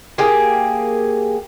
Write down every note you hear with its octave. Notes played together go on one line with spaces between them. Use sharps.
A#3 G4 G#4